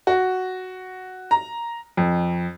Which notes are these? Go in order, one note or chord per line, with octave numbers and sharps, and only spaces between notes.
F#4
A#5
F2